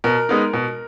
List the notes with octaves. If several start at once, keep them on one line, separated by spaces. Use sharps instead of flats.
B2 A#4
G#3 B3 D#4
B2